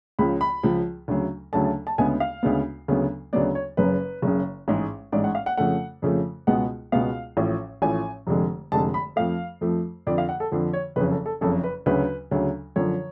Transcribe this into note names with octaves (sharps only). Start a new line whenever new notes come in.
C#2 C#3 F3 B5
B5
C#2 C#3 F3
D2 C#3 F#3 A3
D2 C#3 F#3 A3 A5
A5
A5
D2 C#3 G#3 B3 G#5
F5
D2 C#3 G#3 B3
D2 C#3 F#3 B3
D2 C#3 F#3 B3 D5
C#5
F#1 F#2 C#3 B4
F#1 F#2 C#3
A1 G#2 G#3
A1 G#2 G#3 D5
F#5
F5
F#5
F2 C#3 F3 A3 F#5
F2 C#3 F3 A3
C#2 B2 G#3 B3 F#5
C#2 B2 G#3 B3 F5
A1 A2 F3
A1 A2 F3 G#5
F1 F2 D3 G#3
F1 F2 D3 G#3 A5
B5
F2 F3 A3 F5
F2 F3 A3
F2 D3 F3 D5
F5
F#5
A4
F2 D3 F3
C#5
F#1 F2 C#3 B4
A4
A4
F#1 F2 C#3 A4
B4
D2 C#3 F#3 B4
D2 C#3 F#3
F#2 D3 F3 C#5